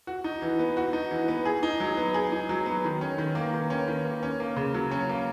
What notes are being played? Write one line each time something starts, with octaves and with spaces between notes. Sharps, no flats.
F#4
D#4
E3
B3
F#4
D#4
E3
B3
G#4
D#4
F#3
B3
G#4
D#4
F#3
B3
D#3
C#4
D#3
A#3
D#3
C#4
D#3
A#3
C#4
A#3
C#3
F#3
C#4
A#3